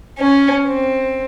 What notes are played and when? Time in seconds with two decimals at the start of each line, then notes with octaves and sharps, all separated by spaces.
0.19 C#4
0.66 C4